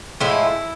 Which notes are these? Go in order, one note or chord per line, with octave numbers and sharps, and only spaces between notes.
A2 F3 G#3 E4